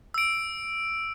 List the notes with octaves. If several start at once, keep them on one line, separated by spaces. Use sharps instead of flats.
E6 D7